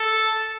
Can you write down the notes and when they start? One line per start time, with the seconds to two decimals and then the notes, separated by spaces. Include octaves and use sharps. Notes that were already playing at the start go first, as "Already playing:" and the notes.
Already playing: A4